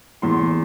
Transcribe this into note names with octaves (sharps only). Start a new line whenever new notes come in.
E2 C6